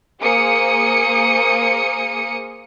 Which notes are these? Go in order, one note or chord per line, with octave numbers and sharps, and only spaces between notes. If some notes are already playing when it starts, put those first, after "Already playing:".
A#3 G#4 C5 D#6 C#7